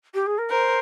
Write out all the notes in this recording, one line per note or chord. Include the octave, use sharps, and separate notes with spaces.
G4
G#4
A#4
A#4 C5